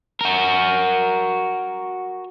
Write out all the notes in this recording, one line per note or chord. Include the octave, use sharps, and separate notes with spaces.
F#4 A#4